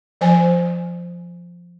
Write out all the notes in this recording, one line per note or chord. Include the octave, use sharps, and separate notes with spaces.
F3 C5 G#5